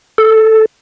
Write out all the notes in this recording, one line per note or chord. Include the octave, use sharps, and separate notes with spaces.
A4